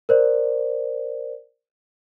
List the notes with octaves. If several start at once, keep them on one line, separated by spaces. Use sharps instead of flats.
A#4 C5 D5